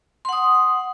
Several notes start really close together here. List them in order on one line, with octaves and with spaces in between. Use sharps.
C6 F#5 D#6